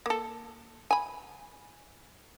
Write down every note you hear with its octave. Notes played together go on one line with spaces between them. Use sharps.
A#3 A4
G#5 B5